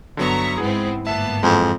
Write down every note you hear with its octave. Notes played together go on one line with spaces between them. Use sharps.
G1 D3 F#3 B3 E5 A#5 C#6
G#2 G#3 B3 C4 E4 G#4
G1 G#2 A#3 B3 E5 A5
F2 E3 G#3